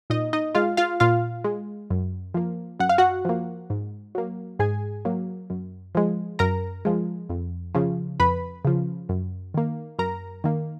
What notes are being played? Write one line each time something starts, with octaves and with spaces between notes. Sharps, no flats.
A#2 D#4 D#5
D#4 D#5
G#3 F4 F5
F4 F5
A#2 F4 F5
G#3
F#2
F3 A#3
F#2 F#5
F5
F#4 F#5
F3 A#3
G#2
F#3 A#3
G#2 G#4 G#5
F#3 A#3
F#2
F3 G#3
F#2 A#4 A#5
F3 G#3
F2
C#3 F3
F2 B4 B5
C#3 F3
F#2
D#3 A#3
F#2 A#4 A#5
D#3 A#3